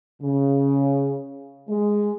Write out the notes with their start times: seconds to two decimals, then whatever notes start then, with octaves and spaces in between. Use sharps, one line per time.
0.22 C#3
1.69 G#3